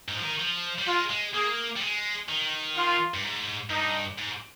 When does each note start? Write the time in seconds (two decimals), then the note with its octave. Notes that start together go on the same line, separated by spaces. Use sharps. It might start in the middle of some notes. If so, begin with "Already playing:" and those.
0.08 G#2
0.16 F3
0.23 D#3
0.40 F3
0.79 G3
0.87 G#3 F4
1.10 G#3
1.34 A#3 G#4
1.77 G3
1.81 G#3
2.29 D#3
2.76 F4
3.14 G2
3.23 G#2
3.70 G2 D#4
4.18 G#2